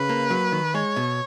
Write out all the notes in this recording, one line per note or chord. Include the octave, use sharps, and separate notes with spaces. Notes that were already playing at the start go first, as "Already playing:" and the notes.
Already playing: C#3 B4
A#3
F#3
D#3
G#3 C#5
B2